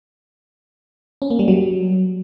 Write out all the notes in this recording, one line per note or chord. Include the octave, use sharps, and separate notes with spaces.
C#4
A#3
G3
F#3